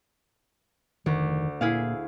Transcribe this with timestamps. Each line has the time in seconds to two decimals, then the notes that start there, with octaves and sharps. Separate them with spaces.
1.06 F1 D2 D#3
1.61 A#2 E4 G#4 F5